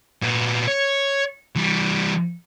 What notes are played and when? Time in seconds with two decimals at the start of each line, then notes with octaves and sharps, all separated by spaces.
0.22 A#2 B3
0.68 C#5
1.56 E3 G3